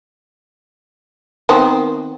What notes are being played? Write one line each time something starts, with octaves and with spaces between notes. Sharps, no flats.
D#3 B3 C4